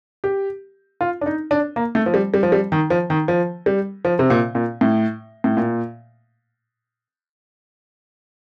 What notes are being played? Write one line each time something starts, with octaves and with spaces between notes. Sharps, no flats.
G4
F4
D4
D#4
D4
A#3
A3
F3
G3
G3
F3
G3
D#3
F3
D#3
F3
G3
F3
C3
A#2
A#2
A2
A2
A#2